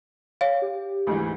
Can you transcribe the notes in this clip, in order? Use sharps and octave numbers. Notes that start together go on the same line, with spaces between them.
C#5 F5
G4
D2 G#2 E3